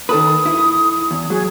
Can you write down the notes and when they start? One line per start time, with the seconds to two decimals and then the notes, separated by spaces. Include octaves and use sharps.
0.09 D#3 A4 B4 D#6
0.45 E4
1.11 E2
1.30 F#3 G#4